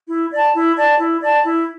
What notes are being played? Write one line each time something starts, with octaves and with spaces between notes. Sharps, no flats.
E4
D5 A5
E4
D5 A5
E4
D5 A5
E4